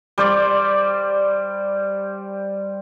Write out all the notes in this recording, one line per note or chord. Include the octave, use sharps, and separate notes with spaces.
G3 C5 D5